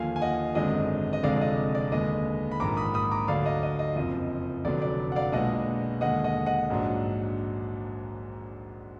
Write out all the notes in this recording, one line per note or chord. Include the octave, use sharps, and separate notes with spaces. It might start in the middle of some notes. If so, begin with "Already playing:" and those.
Already playing: D#2 D3 F3 F5 G#5
G#5
D#5 F#5
G#1 F#2 D3 G#3 D4 D#5
D#5
F1 F2 D3 G#3 D5 F5
D5
D#5
D5
D#2 D3 G#3 B3 D#5
B5
A#1 G#2 D#3 A#3 A#5 D6
B5 D#6
B5 D#6
A#5 D6
D2 D3 F#3 D5 F5
D#5
D#5
D#5
F#1 F2 F3 D#5
F1 F2 D3 F#3 B3 D5
D5
F#5
D5 F5
B1 A#2 G#3 B3 D4 D#5 F#5
D#2 D3 G#3 D#5 F#5
D#5 F#5
D#5 F#5
A#1 G#2 F#3 D4